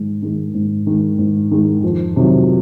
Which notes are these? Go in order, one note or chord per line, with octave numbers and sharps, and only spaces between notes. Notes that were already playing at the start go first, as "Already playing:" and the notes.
Already playing: G#2 D#3 G#3
D#3 G#3
G#2
D#3 G#3
G#2
D#3 G#3
F2
C3 D#3 F#3